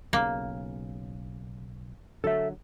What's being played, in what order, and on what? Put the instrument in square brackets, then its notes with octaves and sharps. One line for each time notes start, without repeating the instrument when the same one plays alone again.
[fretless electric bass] B1 C#3 [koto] A#3
[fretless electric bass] D3 F#3 [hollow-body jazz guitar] A4 E5